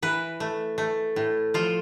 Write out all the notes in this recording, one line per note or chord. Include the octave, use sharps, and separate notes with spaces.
E3 B4
A3
A3
A2
F3 F4